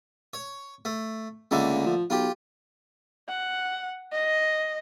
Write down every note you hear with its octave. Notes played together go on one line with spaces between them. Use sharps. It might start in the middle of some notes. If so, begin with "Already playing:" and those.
C#5
A3
C#2 D3 A3 A#3
F3
B1 F4 G4
F#5
D#5